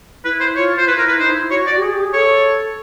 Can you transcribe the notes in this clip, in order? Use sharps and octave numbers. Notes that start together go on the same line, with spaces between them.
E4 B4
C5
F4 C#5
F4 C5
E4 B4
A#4
B4
D#4 C5
E4
F#4 C#5
D5
G4
G#4
G4
G#4
A4 C#5